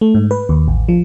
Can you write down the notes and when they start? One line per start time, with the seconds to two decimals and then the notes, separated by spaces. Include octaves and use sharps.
0.01 A3
0.14 G#2
0.31 B4
0.49 D#2
0.68 A1
0.89 F3